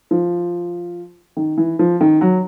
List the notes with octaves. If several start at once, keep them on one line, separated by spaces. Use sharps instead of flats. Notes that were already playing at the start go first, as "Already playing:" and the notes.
F3
D#3
E3
F3
D#3
F#3